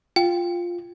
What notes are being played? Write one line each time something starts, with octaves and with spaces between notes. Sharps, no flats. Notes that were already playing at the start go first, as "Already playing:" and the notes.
F4 G5